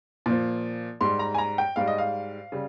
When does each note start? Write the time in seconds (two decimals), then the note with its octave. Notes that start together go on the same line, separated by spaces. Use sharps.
0.26 A#2 F3
1.01 G#2 G3 C6
1.19 A#5
1.34 G#5
1.38 A#5
1.58 G5
1.76 G#2 G3 F5
1.88 D#5
1.98 F5
2.52 C#3 G3